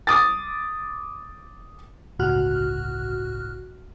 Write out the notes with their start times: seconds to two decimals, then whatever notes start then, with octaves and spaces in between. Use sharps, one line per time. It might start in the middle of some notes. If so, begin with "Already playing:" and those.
0.07 D6 D#6 A6
2.19 G1 C#2 A2 F#4 F6 F#6